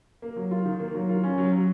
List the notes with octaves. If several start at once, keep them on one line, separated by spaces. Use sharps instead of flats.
A#3
F#3
F4
D#3
A#3
F#3
F4
C#4
F#3
F#3